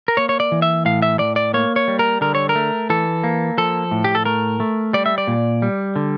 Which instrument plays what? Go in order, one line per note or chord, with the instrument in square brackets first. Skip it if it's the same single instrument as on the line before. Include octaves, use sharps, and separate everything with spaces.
[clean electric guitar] A#4
A#3 C#5
C#5
D5
E3
E5
A2 F5
E5
A2 D5
D5
A#3 C#5
C#5
G3
A#4
D3 A#4
C#5
A#4
A3
E3 A4
A#3
F3 A4
A2
G4
A4
A3 A#4
A3
G3 D5
E5
D5
A#2
G3
D3